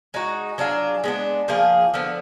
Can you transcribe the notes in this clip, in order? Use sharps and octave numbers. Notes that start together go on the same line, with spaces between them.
G#3 D#4 F#4
F#3 D4 F4 G#4
G#3 B3 D4
F3 A#3 F4 G#4
D3 F3 B3